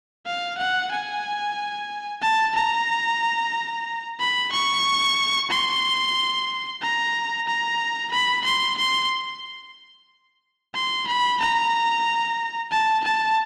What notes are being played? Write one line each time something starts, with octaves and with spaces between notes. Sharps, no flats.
F5
F#5
G#5
A5
A#5
B5
C#6
C6
A#5
A#5
B5
C6
C6
C6
B5
A#5
A5
A5